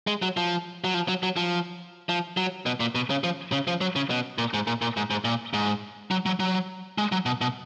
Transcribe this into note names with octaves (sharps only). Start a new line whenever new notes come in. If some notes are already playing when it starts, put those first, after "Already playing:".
G#3
F#3
F3
F#3
F3
F#3
F#3
F3
F3
F#3
B2
A#2
B2
C#3
F3
C#3
F3
F#3
C#3
B2
A#2
G#2
A#2
A#2
G#2
G#2
A#2
G#2
F#3
F#3
F#3
G#3
F#3
B2
B2